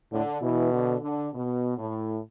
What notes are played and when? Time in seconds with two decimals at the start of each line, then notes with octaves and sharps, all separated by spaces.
0.12 A2 D3
0.41 B2 E3
0.71 D3
1.02 D3
1.33 B2
1.77 A2